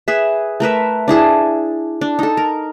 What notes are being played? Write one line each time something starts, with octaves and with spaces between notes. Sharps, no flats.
G#4 B4 E5
A3 A#4 B4 E5
D4 E4 G#4 A5
D4
D#4 A4
A#4